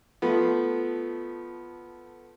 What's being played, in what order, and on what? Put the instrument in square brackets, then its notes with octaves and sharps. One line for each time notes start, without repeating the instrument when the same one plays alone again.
[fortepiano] F3 A3 B3